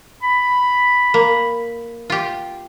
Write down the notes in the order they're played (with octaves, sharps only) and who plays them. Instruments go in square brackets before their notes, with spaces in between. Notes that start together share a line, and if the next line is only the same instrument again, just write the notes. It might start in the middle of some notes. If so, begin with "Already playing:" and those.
[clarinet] B5
[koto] A#3
F4 G4